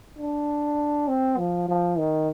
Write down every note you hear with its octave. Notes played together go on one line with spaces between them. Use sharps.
D4
C4
F3
F3
D#3